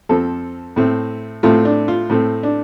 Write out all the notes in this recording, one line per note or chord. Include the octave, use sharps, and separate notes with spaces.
F2 F3 C4 A4
A2 A3 C4
A2 A3 C4 F4
D4
F4
A2 A3 C4
D4